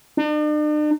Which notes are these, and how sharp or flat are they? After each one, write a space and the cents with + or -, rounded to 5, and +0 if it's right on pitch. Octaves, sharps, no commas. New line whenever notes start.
D4 +45